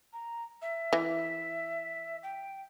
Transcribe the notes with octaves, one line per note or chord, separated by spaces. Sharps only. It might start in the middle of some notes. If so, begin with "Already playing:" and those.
A#5
E5
E3
G5